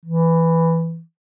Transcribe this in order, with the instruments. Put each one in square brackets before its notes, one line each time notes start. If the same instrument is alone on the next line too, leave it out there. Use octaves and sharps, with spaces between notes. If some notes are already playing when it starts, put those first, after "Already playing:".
[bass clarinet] E3